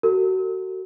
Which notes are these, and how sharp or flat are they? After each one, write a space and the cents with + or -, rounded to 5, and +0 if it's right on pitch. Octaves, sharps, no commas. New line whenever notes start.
F#4 +25 A4 +45